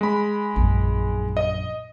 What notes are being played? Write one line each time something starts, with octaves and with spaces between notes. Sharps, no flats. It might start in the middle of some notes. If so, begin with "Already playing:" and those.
G#3 B5
A#1 F#2
D#5